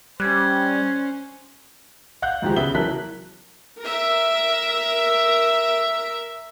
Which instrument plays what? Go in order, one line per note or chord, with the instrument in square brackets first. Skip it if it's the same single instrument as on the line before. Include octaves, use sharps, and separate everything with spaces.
[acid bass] G3 [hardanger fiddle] C#4 C5 [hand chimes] F#6 G#6
[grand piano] F5 F#5 F#6 G6
D2 G#2 D#3 F3 G#3 G4
C#3 B3 E5 G7
E3 F#3 A#4 A5 F#6 B6
[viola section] A#4 E5